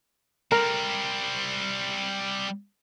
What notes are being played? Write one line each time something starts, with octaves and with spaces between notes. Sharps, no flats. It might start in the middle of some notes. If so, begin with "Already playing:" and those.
G3 C4 A#4